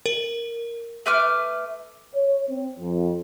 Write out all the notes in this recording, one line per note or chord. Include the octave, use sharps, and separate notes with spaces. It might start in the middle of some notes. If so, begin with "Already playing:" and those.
A#4
A3 B4 D6 F6
C#5
C4
F2